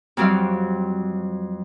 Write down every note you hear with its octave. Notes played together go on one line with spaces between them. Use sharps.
F2 F#3 G3 C4 D5 F5